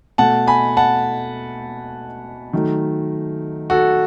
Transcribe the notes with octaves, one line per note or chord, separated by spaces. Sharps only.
B2 A3 F#5 A5
G#5 B5
F#5 A5
D#3 F#3 A3
F#4 A4